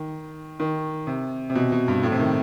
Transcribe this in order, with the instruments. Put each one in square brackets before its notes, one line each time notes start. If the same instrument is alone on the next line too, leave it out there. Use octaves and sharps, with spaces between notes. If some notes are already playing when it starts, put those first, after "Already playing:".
Already playing: [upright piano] D#3
D#3
C3
C3
B2
B2
G2
A2
C3
D#3